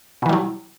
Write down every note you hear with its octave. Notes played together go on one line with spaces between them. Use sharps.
B2 E3 F#3 G3